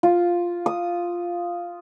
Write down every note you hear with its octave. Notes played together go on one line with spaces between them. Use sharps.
F4
D#6